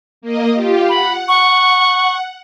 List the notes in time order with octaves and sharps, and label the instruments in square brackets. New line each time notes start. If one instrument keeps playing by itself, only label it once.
[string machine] A#3 D#5
F4 G4
[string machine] F#5 [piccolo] B5
[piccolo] C#6